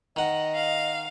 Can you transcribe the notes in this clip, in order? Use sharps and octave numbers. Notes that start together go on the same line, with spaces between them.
D#3 D#5 F#5
F5